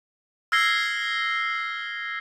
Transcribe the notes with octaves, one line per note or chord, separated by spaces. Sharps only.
E6 F6 G#6 A#6 C7 G7